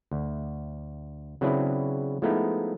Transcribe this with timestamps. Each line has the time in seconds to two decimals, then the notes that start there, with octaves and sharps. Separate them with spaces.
0.11 D2
1.41 C#3 F#3 C4 D4 E4 B4
2.22 F3 G#3 A3 B3 D#4 E4